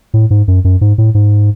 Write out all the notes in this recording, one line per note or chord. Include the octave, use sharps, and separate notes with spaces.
A2
G#2
F#2
F#2
G#2
A2
G#2